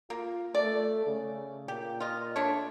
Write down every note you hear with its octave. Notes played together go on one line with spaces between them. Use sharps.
A#3 F4
A3 D5
C#3
A#2 G4
F4 D#5
A3 D4 C#5